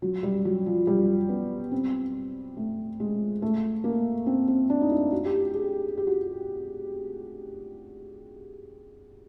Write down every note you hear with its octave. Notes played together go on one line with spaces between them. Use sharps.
F#3
G3
F#3
F3
G3
B3
C4
A3
G#3
A3
A#3
C4
C4
D4
D#4
E4
F#4
G4
F#4
G#4
G4
F#4